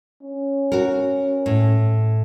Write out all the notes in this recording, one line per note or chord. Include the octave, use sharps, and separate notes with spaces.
C#4
F#4 A#4
A2